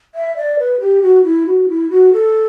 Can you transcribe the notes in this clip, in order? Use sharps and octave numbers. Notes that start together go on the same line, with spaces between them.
E5
D5
B4
G4
F#4
E4
F#4
E4
F#4
A4